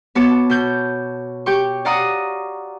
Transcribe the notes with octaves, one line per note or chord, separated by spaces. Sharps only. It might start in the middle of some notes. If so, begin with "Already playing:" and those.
B3 F#4 C#5 A5 D6
B2 G6
G4 G5 C#6
D5 F5 F#5 A#5 C#6 D#6